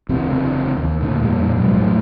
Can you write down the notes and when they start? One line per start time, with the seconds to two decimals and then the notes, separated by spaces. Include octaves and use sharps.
0.09 F#1 E2 C3 C4
0.77 D#2
1.01 D2 A#2
1.23 F2 A#2 G3
1.57 F#2 B2 F#3 G#3
1.73 E2 A2 F#3 A3